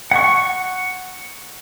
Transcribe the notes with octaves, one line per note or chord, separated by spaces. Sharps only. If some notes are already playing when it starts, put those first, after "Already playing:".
F#5 C#6